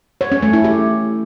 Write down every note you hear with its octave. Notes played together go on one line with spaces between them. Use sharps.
C#5
C#4
A3
E4
G4